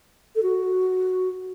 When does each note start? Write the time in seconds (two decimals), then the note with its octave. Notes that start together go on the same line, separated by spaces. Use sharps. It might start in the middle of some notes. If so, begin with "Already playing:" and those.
0.36 A4
0.43 F#4